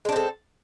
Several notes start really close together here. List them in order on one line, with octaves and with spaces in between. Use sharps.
G#3 D4 C4 A4